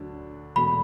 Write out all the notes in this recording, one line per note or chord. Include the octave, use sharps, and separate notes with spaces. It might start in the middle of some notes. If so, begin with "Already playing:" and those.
Already playing: D2 D3 F#3 D4
E1 E2 B2 A3 B5